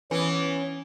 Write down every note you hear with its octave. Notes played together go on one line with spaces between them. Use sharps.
E3 B3 C#4